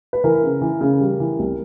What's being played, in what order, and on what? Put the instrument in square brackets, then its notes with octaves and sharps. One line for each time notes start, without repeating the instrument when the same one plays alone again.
[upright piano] B4
E3 A#4
C#3
E3
C#3
G3
E3
C2